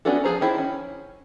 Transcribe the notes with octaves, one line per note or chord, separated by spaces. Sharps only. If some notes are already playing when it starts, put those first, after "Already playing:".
B3 C#4 D4 F#4 A4
F3 E4 G#4 C5 A#5
D#3 E4 C5
C#4